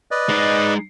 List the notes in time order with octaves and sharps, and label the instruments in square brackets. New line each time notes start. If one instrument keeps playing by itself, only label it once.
[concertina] B4 D5 D#5
[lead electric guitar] G#3 D#4